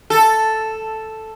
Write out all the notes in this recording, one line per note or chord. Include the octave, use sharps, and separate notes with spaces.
A4